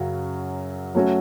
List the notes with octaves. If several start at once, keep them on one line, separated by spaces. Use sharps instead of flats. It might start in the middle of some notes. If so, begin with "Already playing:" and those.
Already playing: F#2 C#3 F#3
F#3 A3 C#4 F#4